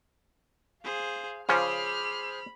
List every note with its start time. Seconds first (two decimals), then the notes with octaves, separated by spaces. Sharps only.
0.84 G#4 C5 F5
1.49 C#3 F3 C#4 G#4 C5 B5 D6 F6